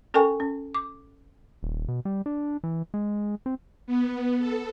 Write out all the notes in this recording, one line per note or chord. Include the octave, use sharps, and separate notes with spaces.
C#4 A4 A#4 G5 G#5 C#6
C#4
D6
D#1
B2
G3
D4
E3
G#3
C4
B3
A4